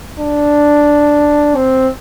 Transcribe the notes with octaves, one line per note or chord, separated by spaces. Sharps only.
D4
C4